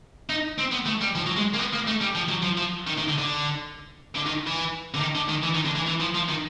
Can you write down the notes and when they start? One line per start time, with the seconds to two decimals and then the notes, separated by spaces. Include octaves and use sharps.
0.29 D#4
0.59 C4
0.72 B3
0.86 A3
1.01 G3
1.15 F3
1.26 F#3
1.36 G#3
1.54 A#3
1.58 B3
1.73 A#3
1.87 A3
2.01 G3
2.15 F3
2.29 F#3
2.43 F3
2.58 F3
2.87 D#3
2.98 D#3
3.08 D3
3.18 D3
4.15 D3
4.26 D#3
4.47 E3
4.94 D3
5.00 D#3
5.15 D3
5.29 D#3
5.43 E3
5.54 D#3
5.65 D3
5.75 E3
5.86 E3
6.00 F3
6.14 F3
6.28 D#3